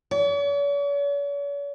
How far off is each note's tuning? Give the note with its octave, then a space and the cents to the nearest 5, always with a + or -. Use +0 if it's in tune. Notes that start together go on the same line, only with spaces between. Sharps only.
C#5 +45